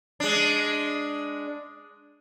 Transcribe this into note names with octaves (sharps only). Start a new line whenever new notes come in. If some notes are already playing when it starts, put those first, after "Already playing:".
G#3 D4